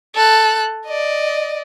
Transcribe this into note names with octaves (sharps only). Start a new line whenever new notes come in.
A4 F#6
D5 D#5